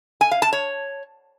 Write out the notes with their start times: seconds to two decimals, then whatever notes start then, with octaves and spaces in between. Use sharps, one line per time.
0.21 G#5
0.31 F5
0.42 A5
0.53 C#5